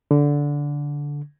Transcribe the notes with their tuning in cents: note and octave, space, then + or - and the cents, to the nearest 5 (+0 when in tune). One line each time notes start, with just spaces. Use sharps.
D3 -15